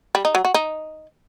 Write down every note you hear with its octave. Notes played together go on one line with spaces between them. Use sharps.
G3
D#4
F#3
F#4
D#4